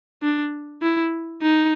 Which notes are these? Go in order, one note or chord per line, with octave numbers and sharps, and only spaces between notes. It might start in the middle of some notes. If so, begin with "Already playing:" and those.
D4
E4
D#4